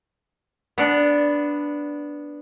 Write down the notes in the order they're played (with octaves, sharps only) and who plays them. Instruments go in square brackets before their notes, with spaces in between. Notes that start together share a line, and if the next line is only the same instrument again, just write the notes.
[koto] B3 D4